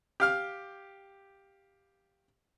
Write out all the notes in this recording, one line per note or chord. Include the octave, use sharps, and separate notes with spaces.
G4 F5 F6